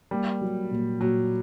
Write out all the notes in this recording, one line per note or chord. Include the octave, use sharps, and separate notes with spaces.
G3 A#3
F#3
A#2
A#2 F#3